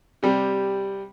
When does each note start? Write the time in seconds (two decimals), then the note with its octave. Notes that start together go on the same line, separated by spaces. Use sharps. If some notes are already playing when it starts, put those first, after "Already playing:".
0.23 C3 G3